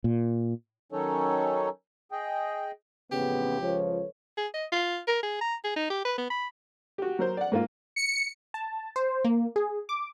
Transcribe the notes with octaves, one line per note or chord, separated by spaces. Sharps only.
A#2
D#3 F#3 C#4 D#4 A4 C#5
G#4 D#5 G5
A1 F2 C#3 B3 G4
C#2 F3 A4 B4 C#5
G#4
D#5
F4
A#4
G#4
A#5
G#4
D#4
G4
B4
B3
B5
F#4 G4
F#3 A#4 C5
D5 F#5
G#2 A#3 F4
C#7
A5
C5
A#3
G#4
D6